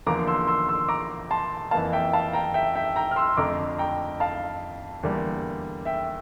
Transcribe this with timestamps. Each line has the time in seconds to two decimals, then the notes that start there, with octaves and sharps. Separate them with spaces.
0.06 E2 D3 F3 A#3 A#5 D6
0.28 C6 E6
0.48 C6 E6
0.68 C6 E6
0.88 A#5 D6
1.31 A5 C6
1.71 A#3 F5 A5
1.74 F2 E3
1.92 E5 G5
2.13 F5 A5
2.33 G5 A#5
2.54 E5 G5
2.76 E5 G5
2.96 G5 A#5
3.11 F6
3.16 C6 E6
3.37 F2 D3 A3 A#5 D6
3.78 G5 A#5
4.20 F5 A5
5.03 E2 D3 G3 A#3
5.85 E5 G5